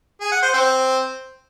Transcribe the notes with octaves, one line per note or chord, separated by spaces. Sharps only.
G#4
F#5
C5
C4